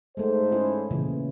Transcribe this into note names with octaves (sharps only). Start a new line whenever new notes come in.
G#2 G#3 A3 C5
C#4 E4 G#4
A#2 C#3 E3